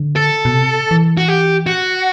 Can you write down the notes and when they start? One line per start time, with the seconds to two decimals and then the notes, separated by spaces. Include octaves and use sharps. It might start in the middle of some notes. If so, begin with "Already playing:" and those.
Already playing: D3
0.16 A4
0.45 B2
0.54 C3
0.91 E3
1.18 F#4
1.28 G4
1.67 F#4